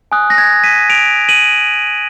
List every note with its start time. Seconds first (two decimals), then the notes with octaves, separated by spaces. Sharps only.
0.12 G#5 D#6 F#6
0.30 A#6
0.38 G#6
0.64 B6 D#7
0.90 D7 F7
1.29 D#7 F#7